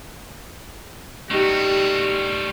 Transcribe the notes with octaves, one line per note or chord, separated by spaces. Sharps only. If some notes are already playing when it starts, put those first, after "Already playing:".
G3 A3 D#4 F#4 G4